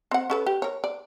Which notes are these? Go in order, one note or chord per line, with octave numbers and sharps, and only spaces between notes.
C4 F#5
C#4 A4 B4
G4
A#4 C#5
D5